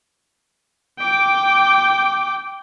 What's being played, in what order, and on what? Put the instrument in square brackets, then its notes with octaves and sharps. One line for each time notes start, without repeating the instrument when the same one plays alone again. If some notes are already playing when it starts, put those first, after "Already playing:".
[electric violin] G5 D6